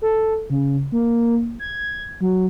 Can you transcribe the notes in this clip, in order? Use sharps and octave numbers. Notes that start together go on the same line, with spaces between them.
A4
C#3
A#3
G#6
F#3